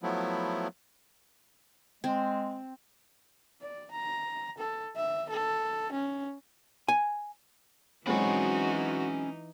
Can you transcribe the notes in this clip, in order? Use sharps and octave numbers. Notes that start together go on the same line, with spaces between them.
F3 F#3 A3 B3 E4
G#3 C4
D5
A#5
A4
E5
A4
C#4
G#5
E3 F#3 G#3 C4 C#4 D#4 F#4 B5